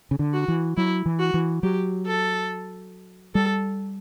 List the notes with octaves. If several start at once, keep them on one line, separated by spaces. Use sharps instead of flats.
C#3
D3
F#4
E3
F#3 E4
E3
F#4
E3
F#3 G4
A4
G3 A4